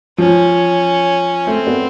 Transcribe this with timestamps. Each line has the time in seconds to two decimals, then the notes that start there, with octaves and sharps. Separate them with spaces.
0.18 F3 C#4
1.46 A3 C4
1.67 B3